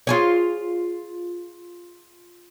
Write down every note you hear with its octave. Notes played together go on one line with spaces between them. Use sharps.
F4 G#4 C#5